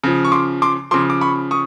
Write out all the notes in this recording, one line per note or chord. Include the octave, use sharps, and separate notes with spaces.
C#3 F3
C#6
C6 D6
C6 D6
C#3 F3 C6 D6
D6
B5 C#6
C#6 D#6